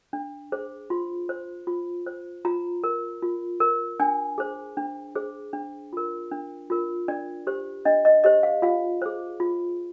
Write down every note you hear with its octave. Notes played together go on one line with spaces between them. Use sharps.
D4
G#4 C5
F4 C6
C5
F4
C5
F4 A#5
A#4
F4
A#4
D4 G#5
G#4 C5
D4
G#4 C5
D4
F4 A#4
D4
F4 A#4
D4 D5
G4 C5
D4 D#5
D#5
G4 C5 D#5
F5
F4 F5
G#4 C5
F4